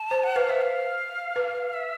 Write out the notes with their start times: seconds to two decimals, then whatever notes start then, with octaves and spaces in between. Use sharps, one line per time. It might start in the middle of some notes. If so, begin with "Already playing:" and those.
Already playing: A5
0.11 C5
0.24 F#5
0.36 B4 F5
0.49 C5 E5
0.61 F5
1.36 B4
1.73 E5